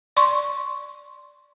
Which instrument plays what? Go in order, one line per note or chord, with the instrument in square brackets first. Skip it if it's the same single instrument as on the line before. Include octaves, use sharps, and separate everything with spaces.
[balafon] D5 C6 C#6